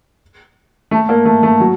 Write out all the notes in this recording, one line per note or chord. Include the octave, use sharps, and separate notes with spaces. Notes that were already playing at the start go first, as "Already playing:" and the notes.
A3
A#3
A3
A3
F#3